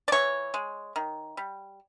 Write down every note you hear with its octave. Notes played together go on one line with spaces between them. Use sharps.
D5
E3 C#5
G#3
D#3
G3